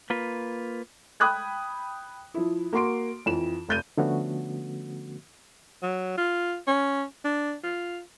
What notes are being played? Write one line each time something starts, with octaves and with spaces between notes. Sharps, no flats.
A#3 F4 B4
G5 B5 D#6 F#6 G#6
F3 E4
A#3 F#4 C6 D7
F2 E3 E7
F1 G6 D#7
D3 F3 A3 B3 C#4 F#4
F#3
F4
C#4
D4
F4